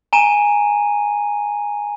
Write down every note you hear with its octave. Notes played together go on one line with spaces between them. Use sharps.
G#5 A#5 D#7